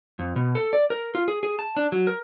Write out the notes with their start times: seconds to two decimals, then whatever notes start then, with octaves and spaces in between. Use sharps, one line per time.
0.19 F2
0.36 B2
0.55 A4
0.73 D5
0.90 A#4
1.15 F4
1.28 G#4
1.43 G#4
1.59 A5
1.77 D4
1.92 F#3
2.07 A#4